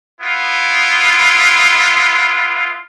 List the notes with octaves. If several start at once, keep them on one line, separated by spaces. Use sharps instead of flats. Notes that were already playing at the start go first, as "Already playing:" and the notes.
B3 E4 F4